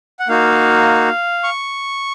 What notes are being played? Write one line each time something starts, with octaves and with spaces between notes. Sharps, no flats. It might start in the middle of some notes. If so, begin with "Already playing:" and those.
F#5
A#3 D#4 F#4 F5
C#6